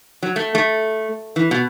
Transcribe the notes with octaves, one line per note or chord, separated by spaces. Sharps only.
F#3
A3
A3
E3
B2